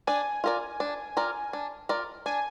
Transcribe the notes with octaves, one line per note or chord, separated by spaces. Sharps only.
D4 G#5
F4 A#4 D5
D4
F4 A#4 D5
D4
F4 A#4 D5
D4 G#5